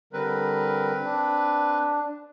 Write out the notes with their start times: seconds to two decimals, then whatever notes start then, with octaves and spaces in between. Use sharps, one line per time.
0.13 D3 G3 C4 A#4 B4
1.04 D4